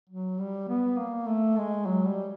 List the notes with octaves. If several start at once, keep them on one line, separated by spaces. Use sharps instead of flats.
F#3
G3
B3
A#3
A3
G#3
F#3
G3